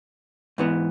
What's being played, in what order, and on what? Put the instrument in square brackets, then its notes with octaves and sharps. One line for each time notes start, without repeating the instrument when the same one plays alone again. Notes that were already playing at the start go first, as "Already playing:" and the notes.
[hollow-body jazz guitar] G#2 E3 B3